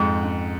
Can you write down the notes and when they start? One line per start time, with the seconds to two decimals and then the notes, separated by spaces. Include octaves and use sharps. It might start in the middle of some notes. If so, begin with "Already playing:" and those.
Already playing: F2 G#2 G#4
0.23 C#4